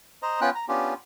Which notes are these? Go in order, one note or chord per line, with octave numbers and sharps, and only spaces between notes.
C5 D#5 A#5
B3 C#4 F4 G5 F#6
A#5
B3 C#4 D4 F4 G4